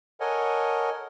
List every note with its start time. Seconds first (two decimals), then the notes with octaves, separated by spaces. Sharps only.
0.20 A4 A#4 C#5 D#5 F#5 G#5